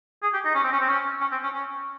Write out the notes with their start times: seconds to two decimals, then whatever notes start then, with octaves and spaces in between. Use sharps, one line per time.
0.23 G#4
0.34 G4
0.45 D#4
0.55 C#4
0.64 C4
0.72 C#4
0.80 C4
0.88 C#4
1.21 C#4
1.32 C4
1.43 C#4
1.53 C#4